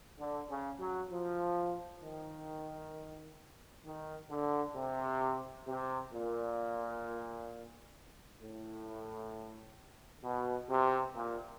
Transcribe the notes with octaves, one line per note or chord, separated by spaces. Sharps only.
D3
C#3
F#3
F3
D#3
D#3
D3
C3
C3
A#2
A2
B2
C3
A#2